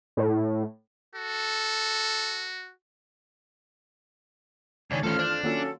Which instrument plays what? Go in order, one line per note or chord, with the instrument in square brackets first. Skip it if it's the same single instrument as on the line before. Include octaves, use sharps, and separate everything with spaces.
[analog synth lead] A2
[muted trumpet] F#4 [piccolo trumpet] A4
[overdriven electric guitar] C#2 D#3 [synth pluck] D4 [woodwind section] C#5 D5 G#5
[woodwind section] F2 F4 F6 [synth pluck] D#3 E3 A3 [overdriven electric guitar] C#4 A4
[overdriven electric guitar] D4 [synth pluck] C5 F5 G6
[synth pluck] D#3 A#3 F4 [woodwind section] F#3 C#4 A4